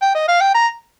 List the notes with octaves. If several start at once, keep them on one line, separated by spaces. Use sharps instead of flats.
G5
D#5
F5
G5
A#5